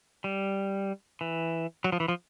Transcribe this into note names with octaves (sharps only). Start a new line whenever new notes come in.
G3
E3
F#3
F3
E3
F3